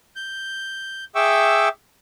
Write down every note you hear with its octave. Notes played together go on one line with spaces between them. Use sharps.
G6
G#4 E5 G5 C#6 D6 E6